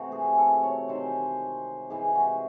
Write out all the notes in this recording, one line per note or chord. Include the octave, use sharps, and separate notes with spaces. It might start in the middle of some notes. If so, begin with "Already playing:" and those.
Already playing: C3 E3 A3 F#4
G#4
A4
C#5
C3 D#3 G#3 C5
C3 E3 G#3 G#4
F#4